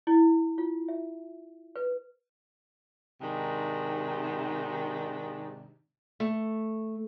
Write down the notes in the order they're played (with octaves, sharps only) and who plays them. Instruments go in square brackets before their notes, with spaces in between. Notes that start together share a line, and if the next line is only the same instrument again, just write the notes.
[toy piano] E4
F4
E5
B4
[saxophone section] G#2 C3 D#3 D4 D#4
[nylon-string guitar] A3